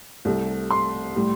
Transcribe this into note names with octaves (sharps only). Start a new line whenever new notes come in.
C2 C3 A3
C6
A2 G3